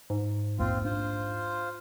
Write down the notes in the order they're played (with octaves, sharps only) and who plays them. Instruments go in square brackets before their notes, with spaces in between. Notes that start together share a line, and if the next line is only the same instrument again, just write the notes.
[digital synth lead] G#2
[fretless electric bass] A#1 E2 A#3 [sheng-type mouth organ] C4 F4
[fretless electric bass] D4 [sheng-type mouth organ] F4 C5